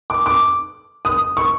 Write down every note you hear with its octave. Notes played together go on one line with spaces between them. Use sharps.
D6
D6
D#6
C#6